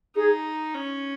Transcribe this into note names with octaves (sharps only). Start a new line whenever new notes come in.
D#4 G#4
C#4